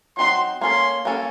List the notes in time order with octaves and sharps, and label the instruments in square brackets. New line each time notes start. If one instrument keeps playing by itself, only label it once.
[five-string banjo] F#3 C4 D#4 F#4 [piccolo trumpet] C6
[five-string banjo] A#3 C#4 A4 [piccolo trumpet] C6
[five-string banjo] A#3 C#4 A4